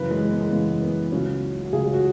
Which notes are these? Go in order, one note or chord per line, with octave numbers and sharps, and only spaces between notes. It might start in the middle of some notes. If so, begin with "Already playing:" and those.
Already playing: F#2 C#3 E3 B4
G#3
B3
G#3
F#2 C#3 E3 B3
B3
C#2 C#3 F#3 C#4
F#4
C#2 C#3 F#3 G#4
F#4